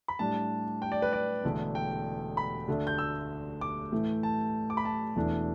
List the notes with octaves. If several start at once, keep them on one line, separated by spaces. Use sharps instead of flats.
B5
A2 G3 D4 A5
G5
D5
B4
D5
E1 E2 D3 A3 D4
G5
B5
D2 D3 A3 D4
G6
E6
D6
A2 E3 A3
A5
D6
B5
A5
E1 E2 E3 A3 D4